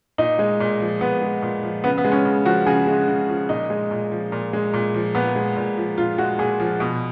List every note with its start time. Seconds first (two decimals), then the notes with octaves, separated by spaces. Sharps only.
0.18 A#2 D#4
0.39 G#3
0.60 A#2
0.80 F3
1.01 A#2 B3
1.22 G#3
1.42 A#2
1.63 F3
1.84 C#3 B3
1.98 B3
2.05 G#3
2.12 C#4
2.25 C#3
2.45 F3 F#4
2.66 C#3 G#4
2.87 G#3
3.08 C#3
3.29 F3
3.49 A#2 D#4
3.70 G#3
3.91 A#2
4.12 F3
4.32 A#2
4.53 G#3
4.73 A#2
4.94 F3
5.15 A#2 B3
5.36 G#3
5.56 A#2
5.77 F3
5.98 A#2 F4
6.18 G#3 F#4
6.39 A#2 G#4
6.60 F3
6.80 B2